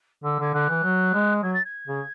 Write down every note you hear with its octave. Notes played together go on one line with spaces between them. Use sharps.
D3 E6
D3 G#6
D3 F#6
E3
F#3
G#3
F#3 G#6
A6
G#6
C#3